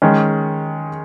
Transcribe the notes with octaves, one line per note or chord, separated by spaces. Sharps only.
D#3 G#3 C#4